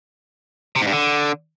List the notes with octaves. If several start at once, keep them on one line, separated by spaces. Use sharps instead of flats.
C3
G#2
G2
D3